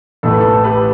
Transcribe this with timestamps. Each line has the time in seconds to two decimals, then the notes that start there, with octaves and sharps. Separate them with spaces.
0.23 A1 A2 A3 A4
0.32 B4
0.41 A4
0.64 G4 B4